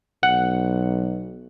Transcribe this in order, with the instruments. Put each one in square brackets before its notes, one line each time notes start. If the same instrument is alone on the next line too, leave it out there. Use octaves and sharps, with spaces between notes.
[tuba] B1 [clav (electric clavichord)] F#5